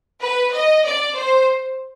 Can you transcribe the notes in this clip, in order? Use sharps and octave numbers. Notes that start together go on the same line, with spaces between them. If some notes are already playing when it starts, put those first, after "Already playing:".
B4
D#5
D5
C5